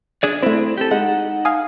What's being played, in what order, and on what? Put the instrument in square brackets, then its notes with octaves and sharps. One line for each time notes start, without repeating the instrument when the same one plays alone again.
[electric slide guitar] D4 G#4 D5
[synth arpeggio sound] A3 C5 [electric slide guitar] C4 E4
[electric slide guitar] G4 A4
[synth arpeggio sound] G#3 [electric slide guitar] D#4 F#5
[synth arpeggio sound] F5 G#5 D#6